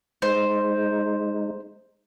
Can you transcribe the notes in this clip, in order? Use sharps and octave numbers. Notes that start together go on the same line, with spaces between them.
G#3 D#4 C5